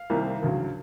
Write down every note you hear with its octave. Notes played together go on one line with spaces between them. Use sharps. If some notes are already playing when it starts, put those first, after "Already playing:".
Already playing: F5
C2 C3 D#3 G3 A#3
D2 C#3 F#3